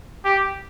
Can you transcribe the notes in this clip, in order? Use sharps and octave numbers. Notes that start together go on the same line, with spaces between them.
G4